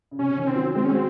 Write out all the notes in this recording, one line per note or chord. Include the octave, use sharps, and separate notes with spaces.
C#3
C3 C#4
D#3
C#4
C4
F#3
G#3 C4
C#4
C4 F#4